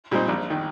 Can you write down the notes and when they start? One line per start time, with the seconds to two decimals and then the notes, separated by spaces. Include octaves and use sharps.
0.11 A#2 G3 C4 D#4
0.29 A#1
0.50 D#3